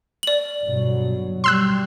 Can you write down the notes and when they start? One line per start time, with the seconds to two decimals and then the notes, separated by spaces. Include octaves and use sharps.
0.23 D5 F#7
0.65 G1 B2 F#3
1.44 G3 C6 E6 F#6